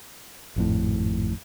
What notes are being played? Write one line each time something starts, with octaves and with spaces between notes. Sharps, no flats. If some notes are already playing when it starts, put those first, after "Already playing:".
G#1 F2 A2